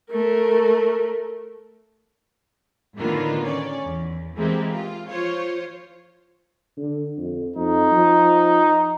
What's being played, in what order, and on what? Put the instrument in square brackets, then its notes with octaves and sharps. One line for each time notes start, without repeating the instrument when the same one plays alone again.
[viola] A3 A#4
[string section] A2 D3 D#3 A#3 B3 F4
C#4 D5
E2
E3 G#3 A#3 C4 E4 G4
F4
F3 F4 C5 C#5
[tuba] D3
F2
[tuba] F2 [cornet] D#4
[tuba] F3